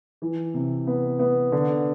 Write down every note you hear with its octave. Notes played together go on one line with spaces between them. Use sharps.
E3
C3
B3
B3
D3